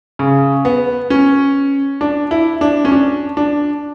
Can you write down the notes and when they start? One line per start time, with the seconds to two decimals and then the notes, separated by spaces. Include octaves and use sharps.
0.19 C#3
0.65 B3
1.10 C#4
2.01 D4
2.31 E4
2.61 D4
2.85 C#4
2.92 D4
3.37 D4